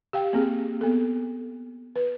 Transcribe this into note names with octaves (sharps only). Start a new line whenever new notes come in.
G4 F5 G5
A#3 C4 G#4
B3 A4
B4